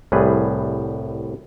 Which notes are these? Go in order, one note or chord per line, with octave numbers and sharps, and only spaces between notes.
C2 A2 G3 G#4 B4